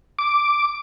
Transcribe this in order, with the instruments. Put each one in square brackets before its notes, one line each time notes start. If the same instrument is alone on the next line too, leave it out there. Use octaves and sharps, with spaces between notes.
[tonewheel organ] D6